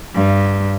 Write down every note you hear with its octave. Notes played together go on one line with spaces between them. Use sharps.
G2